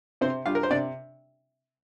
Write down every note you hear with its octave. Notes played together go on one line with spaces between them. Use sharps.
C3 C4 C5
G3 D4 F4 F5
A#4
C5
C3 D4 D5